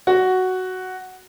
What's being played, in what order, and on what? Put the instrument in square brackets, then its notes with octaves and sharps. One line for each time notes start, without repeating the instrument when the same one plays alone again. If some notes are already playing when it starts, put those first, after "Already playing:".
[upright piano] F#4